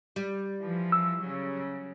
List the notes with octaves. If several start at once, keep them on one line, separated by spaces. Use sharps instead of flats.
G3
E3 F3
E6
C#3 F#3